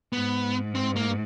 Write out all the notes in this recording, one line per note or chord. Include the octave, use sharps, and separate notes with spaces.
G#2 B3
C4
A#3